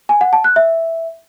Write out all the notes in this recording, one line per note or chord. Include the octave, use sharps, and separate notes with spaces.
G#5
F#5
A5
F#6
E5